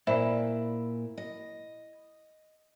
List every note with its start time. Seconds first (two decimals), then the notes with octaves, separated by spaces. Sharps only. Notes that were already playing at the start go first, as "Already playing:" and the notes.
0.07 A#2 E4 C5 D5 E5
1.18 D#5